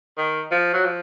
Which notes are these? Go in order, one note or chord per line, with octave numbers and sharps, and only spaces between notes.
D#3
F3
F#3
F3